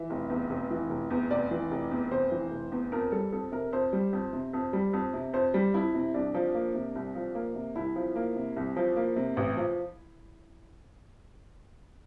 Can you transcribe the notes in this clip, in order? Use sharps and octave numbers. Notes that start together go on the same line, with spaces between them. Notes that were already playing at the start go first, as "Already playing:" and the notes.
Already playing: E3 E5
F1
E2
F1
E3
F1
E2
F1 D5
E3
F1
E2
F1 C5
E3
F1
E2
F2 A#4
G3 A4
F2 A4
C3 A#4
F2 C5
G3
F2
C3
F2
G3
F2
C3
F2 C5
G3
F2 E4
C3
C2 D4
F3
A#3
C3
C2
F3
A#3
C3
C2 E4
F3
A#3
C3
C2
F3
A#3
C3
A1
F3